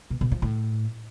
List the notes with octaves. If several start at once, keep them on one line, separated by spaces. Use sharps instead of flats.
B2
B2
F3
A2